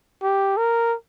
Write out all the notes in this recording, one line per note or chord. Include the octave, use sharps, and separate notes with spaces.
G4
A#4